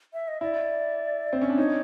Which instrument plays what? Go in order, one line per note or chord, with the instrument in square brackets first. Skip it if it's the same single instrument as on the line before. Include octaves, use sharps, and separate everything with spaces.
[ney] E5
D#5
[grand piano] E4 [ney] D5
[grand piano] C4
C#4
D4
[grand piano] D#4 [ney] C#5